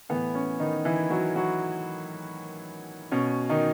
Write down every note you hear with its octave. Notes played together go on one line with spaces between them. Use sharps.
A2 E3 B3
C#4
D#3 D#4
E3 E4
F#3 F#4
F#3 F#4
B2 C#4
D#3 D#4